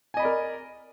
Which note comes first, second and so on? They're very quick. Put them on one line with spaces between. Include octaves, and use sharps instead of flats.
G#5 D#5 B5 D5 A#4